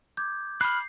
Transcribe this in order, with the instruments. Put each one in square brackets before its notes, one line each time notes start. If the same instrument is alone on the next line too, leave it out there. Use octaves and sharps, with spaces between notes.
[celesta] D6 G#6 [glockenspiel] G6
[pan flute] B5 [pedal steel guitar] F6 F#6 [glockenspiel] C7